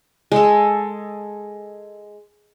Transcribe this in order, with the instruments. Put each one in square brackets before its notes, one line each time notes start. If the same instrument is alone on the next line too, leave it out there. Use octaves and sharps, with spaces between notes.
[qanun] G#3 A4